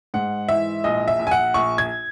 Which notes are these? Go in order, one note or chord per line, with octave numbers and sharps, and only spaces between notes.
G#2 F#5
E3 E5
A#1 D#5
E5
A#1
G#5
F#5
A#1 C#6
G#6